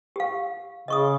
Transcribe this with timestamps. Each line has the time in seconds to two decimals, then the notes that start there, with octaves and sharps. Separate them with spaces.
0.16 G4 F5
0.88 C#3 D#5 C#6 D#6